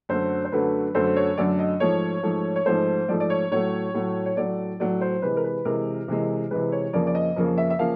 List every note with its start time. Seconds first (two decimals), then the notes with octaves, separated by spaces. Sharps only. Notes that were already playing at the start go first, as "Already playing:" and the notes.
0.09 F#2 D3 F#3 A3 C5
0.45 C5
0.52 F#2 D3 F#3 A3 B4
0.95 F#2 D3 F#3 A3 C5
1.16 C#5
1.37 F#2 D3 F#3 A3 D5
1.59 D#5
1.80 G#2 F3 A3 C#5
2.23 G#2 F3 A3
2.56 C#5
2.66 G#2 F3 A3 C5
3.08 G#2 F3 A3 D5
3.20 D5
3.30 C#5
3.51 A2 F#3 A3 C#5
3.94 A2 F#3 A3
4.26 C#5
4.36 A2 F#3 A3 D5
4.80 A2 F#3 A3 D5
5.01 C5
5.22 C3 E3 G#3 B4
5.37 A#4
5.44 B4
5.65 C3 E3 G#3 A#4
6.08 C3 E3 G#3
6.51 C3 E3 G#3 B4
6.72 C#5
6.93 F2 C#3 F3 A#3 D5
7.07 D5
7.15 D#5
7.36 F2 C#3 F3 A#3
7.58 E5
7.70 E5
7.79 C#3 F3 A#3 F5